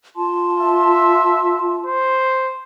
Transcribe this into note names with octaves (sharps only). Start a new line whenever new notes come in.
F4 A5 C6
E5
C5